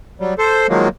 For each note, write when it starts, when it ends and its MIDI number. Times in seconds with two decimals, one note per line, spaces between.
0.20 0.34 54
0.20 0.34 55
0.38 0.67 69
0.38 0.67 72
0.69 0.88 51
0.69 0.88 53
0.69 0.88 54
0.69 0.88 56
0.69 0.88 58